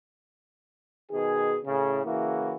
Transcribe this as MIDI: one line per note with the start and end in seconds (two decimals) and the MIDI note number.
1.11 1.58 47
1.11 1.58 51
1.11 1.58 68
1.65 2.00 45
1.65 2.00 49
2.05 2.56 49
2.05 2.56 52
2.05 2.56 58
2.05 2.56 64
2.05 2.56 66